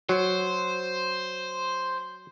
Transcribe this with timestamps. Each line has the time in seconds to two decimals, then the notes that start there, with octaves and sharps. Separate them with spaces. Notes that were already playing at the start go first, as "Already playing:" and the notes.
0.09 F#3 C5